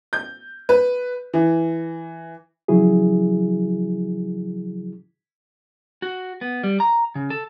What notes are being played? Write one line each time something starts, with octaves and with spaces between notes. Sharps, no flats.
G6
B4
E3
C#3 F3 F#3 E4 F#4 G#4
F#4
B3
G3
A#5
C#3
A4